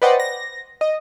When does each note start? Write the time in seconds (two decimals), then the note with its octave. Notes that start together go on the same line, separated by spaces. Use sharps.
0.02 B4 C5 D5 D#5 F#5 G5
0.20 A#6
0.81 D#5